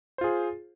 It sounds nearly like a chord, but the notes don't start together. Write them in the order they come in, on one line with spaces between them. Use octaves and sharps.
C5 F4 G#4